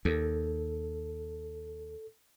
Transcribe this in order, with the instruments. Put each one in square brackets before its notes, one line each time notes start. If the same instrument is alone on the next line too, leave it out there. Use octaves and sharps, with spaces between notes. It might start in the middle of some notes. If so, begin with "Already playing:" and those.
[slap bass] D#2 [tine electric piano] A4